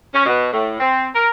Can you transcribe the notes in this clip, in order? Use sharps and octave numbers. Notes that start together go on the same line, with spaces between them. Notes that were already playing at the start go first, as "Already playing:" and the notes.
C#4
B2
A2
C4
A#4